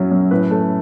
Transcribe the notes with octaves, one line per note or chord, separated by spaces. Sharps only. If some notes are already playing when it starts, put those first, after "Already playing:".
Already playing: F#2 F#3 C#4 E4
F#2
A2 B4
A3